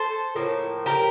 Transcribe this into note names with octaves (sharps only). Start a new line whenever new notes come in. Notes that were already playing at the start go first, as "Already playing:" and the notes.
Already playing: A4 C5
A2 F3 A#3
G4 A#4